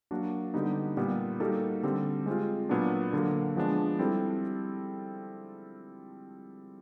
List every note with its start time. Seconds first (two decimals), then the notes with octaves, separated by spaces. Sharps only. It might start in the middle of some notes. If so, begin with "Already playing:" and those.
0.11 F#3 A#3 D4 F#4
0.54 D3 G3 B3 D#4 G4
0.97 A#2 G3 B3
1.40 G3 A#3 D#4 F#4 A4
1.83 D3 G3 C4
2.26 G#3 C4 F4
2.69 A#2 F#3 B3 D4
3.13 D3 F#3 A#3
3.56 F3 G#3 B3 D4
3.99 G3 C4 E4 A4